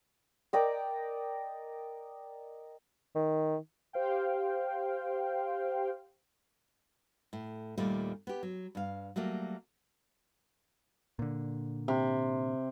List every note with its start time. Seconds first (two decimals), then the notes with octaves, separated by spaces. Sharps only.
0.53 A#4 D5 D#5 G5
3.15 D#3
3.93 G4 C5 F5 G5
7.33 A2
7.78 D#2 A#2 G3 A3
8.27 B3 G4
8.43 F#3
8.75 G2 F5
9.16 F#3 G3 A3 A#3
11.19 A#2 D3
11.88 C3